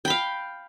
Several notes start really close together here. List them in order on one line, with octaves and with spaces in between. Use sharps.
G5 B5 F5